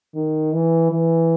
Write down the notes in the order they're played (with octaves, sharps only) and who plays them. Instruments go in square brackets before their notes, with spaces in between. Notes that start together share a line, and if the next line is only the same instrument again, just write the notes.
[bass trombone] D#3
E3
E3